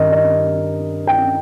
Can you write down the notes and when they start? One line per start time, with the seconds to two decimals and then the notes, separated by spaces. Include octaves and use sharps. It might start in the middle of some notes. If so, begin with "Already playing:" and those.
Already playing: G2 D#3 A#4 D#5
0.12 D#5
1.07 G5